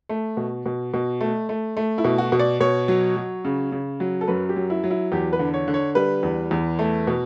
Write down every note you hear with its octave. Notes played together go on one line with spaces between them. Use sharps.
A3
B2
B2
B2
A3
A3
A3
E4
B2
F#4
B2
D5
B2 C#5
F#3
F#3
C#3
C#3
F#3
A4
F#2 B4
G4
F#3
E4
F#3
E4
E2 G4
B4
D3
C#5
D3
C#5
G3 B4
E2
E2
A3
B2